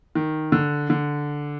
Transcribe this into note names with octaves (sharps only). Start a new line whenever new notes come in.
D#3
D3
D3